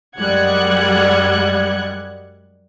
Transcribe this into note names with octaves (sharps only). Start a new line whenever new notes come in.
F#2 G3 G#3 F#5 F#6 G#6